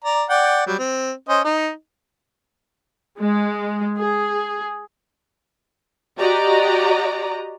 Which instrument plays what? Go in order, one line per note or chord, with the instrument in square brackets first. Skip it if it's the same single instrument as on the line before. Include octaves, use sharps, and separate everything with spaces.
[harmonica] D5 A#5
D5 F#5 G5
F#3 G3
C4
C#4 C5 D#5
D#4 D#5
[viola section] G#3
G#4
[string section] F#4 G4 D5 D#5 A#5